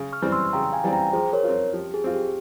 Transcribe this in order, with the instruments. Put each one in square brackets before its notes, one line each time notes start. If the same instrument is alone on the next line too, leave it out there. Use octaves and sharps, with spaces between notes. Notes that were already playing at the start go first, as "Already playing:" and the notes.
Already playing: [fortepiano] C#3
[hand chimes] C#6 F6
[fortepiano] E3 G3 C4
[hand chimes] C6 E6
[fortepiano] C#3 [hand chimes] G5 A#5
[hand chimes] F5 G#5
[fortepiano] E3 G3 C4
[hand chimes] G5 A#5
[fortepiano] F3 [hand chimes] G#4 C5
[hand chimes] A#4 C#5
[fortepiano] C4 F4
[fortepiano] F3 [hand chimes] G4
[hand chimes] G#4
[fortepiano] C4 F4
[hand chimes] G4